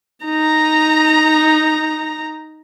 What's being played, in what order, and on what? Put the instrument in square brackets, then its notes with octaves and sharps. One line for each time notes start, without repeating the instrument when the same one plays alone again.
[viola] D#4 A#5